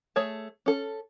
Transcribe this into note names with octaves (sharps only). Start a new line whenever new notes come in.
A3 G#4 C#5 A5
C#4 A4